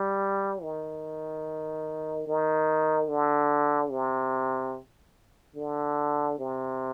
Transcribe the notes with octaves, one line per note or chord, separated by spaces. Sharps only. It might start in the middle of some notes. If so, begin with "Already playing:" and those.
Already playing: G3
D#3
D#3
D3
C3
D3
C3